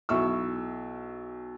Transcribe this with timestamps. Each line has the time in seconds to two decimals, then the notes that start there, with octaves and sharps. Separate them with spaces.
0.09 B1 E4 C#6 E6